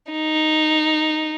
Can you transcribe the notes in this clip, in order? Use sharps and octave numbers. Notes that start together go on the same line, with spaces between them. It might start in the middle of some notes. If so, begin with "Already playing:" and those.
D#4